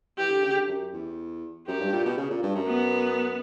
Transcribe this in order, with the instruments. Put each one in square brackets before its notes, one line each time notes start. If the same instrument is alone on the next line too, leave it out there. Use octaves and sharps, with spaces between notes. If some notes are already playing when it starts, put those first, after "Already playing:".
[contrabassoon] E3 [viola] G4
[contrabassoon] D3
C#3
D3
F#2
E2
[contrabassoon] F#2 [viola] G4
[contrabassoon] G2
A#2
B2
C#3
A#2
G2
F#2
[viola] B3